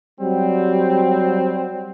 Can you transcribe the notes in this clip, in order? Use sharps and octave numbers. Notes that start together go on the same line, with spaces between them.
F#3 G3 C4